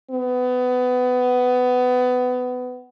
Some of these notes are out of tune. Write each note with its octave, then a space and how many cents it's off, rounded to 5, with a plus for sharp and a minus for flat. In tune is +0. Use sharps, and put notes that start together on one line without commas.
B3 +20